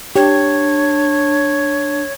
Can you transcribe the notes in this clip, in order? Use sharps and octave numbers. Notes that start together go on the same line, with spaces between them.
D4 G4 C#5